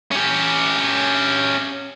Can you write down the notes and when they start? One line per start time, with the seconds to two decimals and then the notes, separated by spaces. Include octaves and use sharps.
0.11 C#4 G4